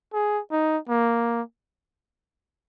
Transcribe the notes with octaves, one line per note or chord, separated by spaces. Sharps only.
G#4
D#4
A#3